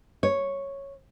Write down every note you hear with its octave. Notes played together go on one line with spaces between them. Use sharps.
C#5